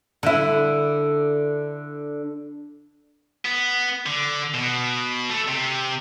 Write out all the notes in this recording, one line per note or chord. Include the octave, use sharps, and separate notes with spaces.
D3 E4
B3
D3
B2
A3
C3